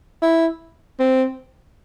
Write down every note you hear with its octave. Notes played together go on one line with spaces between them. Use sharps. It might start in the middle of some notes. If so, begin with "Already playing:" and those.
E4
C4